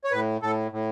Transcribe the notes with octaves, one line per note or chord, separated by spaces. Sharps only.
C#5
A2 B4
A2 A4
A2